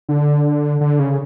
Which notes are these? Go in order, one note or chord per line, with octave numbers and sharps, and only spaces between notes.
D3
D3
C#3